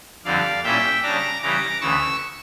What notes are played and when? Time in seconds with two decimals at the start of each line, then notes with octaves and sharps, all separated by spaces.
0.25 F2 D3 G3 D5 F5
0.64 A#2 G3 C#4 E4 E5 G5
1.03 C#3 G3 D4 A#5 D6
1.42 C#3 E3 G3 A#5 D6
1.81 D2 C#3 E3 C#6 E6